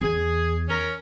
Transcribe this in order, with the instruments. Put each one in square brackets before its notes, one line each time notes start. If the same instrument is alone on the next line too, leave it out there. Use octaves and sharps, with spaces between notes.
[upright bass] E2 [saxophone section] G#4
[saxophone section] C#4 A#4